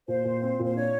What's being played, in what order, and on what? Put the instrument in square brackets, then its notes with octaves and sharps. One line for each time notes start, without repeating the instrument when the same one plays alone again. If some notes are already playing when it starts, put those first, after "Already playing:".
[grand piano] A#2 [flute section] C5
[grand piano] A#2
C4
[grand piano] A#2 [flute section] C5
[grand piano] D4 [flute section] C#5